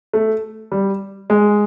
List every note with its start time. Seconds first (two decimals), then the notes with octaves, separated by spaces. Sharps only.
0.13 A3
0.72 G3
1.30 G#3